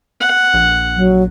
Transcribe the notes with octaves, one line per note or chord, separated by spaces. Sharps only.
F#5
A#1
F#3